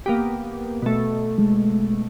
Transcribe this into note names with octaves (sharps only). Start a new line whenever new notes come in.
A#3 B3 G4
B2 A3
G#3